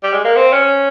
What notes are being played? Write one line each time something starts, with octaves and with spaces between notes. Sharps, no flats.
G3
G#3
A#3
C4
C#4